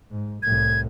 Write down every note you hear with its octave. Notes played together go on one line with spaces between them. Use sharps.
G#2
C2 A2 G#6